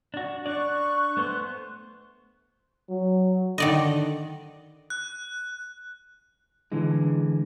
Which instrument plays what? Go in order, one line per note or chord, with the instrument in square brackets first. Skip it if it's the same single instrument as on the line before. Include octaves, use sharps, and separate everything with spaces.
[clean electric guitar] D4 F#4
[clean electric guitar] D4 D5 [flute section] C#6 F#6
[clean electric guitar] A3 B3 C5
[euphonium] F#3
[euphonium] D3 [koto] D#3 D5 D#5
[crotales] F#6
[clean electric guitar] D3 E3 G#3